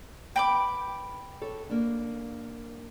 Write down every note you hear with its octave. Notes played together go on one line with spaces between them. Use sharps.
B3 G5 B5 D6
A4 C#5
A#3 D4